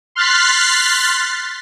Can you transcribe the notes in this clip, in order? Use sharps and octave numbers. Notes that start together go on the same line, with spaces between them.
C6 F6 F#6 A6 B6 C7